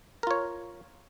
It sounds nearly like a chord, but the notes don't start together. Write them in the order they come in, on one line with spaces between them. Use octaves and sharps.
A#4 F4 C#5